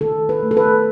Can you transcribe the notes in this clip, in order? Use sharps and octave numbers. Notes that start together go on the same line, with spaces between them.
D#3 A4
B4
A3
A4
B4